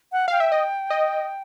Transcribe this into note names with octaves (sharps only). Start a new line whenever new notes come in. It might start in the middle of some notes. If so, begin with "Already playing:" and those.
F#5
F5 G5
E5
D#5
D#5